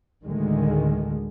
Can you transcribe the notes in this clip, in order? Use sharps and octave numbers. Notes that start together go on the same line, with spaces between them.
D2 A2 D3 D#3 G#3